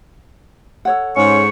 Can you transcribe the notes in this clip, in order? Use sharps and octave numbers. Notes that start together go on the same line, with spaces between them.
A4 C#5 F#5
G#2 C#4 C#6